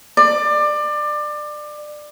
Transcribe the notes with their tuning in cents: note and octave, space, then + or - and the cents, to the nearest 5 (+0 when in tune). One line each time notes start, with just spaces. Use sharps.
D5 +25